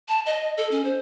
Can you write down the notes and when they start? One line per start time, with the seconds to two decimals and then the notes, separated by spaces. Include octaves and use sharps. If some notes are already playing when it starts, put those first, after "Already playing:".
0.09 A5
0.26 D#5
0.57 A4
0.71 C#4
0.85 C5